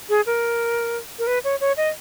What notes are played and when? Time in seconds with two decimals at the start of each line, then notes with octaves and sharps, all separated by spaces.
0.09 G#4
0.26 A#4
1.19 A#4
1.27 B4
1.44 C#5
1.61 C#5
1.77 D#5